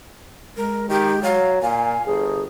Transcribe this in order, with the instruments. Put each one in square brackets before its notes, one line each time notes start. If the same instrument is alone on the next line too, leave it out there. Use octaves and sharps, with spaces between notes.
[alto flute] G#3 [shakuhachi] A#4
[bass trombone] D#3 [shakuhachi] G4
[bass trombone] F#3 [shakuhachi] F5
[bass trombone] A#2 [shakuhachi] F5 [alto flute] G#5
[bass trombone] G1 [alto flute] G#4